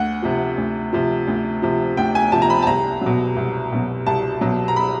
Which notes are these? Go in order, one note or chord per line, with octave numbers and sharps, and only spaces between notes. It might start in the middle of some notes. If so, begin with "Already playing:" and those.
Already playing: D2 F#5
C3 F3
D2
C3 F3
D2
C3 F3
D2 G5
G#5
C3 F3 A5
A#5
B5
A5
C2 A#5
B2 F#3
C2
B2 F#3
C2 A5
B2 F#3
A#5
B5